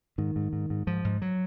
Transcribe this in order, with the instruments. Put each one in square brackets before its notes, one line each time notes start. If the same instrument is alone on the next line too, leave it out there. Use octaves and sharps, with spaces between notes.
[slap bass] G#2 D#3
G#2
G#2
G#2
G#2 F3
G#2
F#3